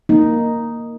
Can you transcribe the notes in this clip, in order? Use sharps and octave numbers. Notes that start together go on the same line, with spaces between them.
A#3 D#4